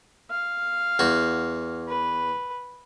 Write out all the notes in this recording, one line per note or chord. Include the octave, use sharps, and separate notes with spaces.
F5
E2 F#4
B4